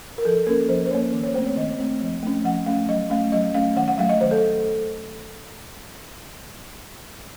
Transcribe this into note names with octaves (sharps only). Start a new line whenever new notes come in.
A#4
F3 A4
A#3 C#4 A#4
F3 C5
C5
A#3 C#4 C#5
D#3
C#5
A3 C4 C5
C#5
D#3 D#5
A3 C4
F3
A3 C#4
F3 F#5
A3 C#4 F5
F#3 D#5
A3 C#4 F5
F#3 D#5
A3 C#4 F5
D#3 F#5
F#5
F#3 A3 F5
D#5
D#3 C5
A4